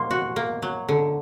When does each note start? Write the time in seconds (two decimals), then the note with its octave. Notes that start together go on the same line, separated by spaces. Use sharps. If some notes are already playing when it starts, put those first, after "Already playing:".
Already playing: A#3 C6
0.11 F#4
0.36 A#3
0.62 F#3
0.89 D3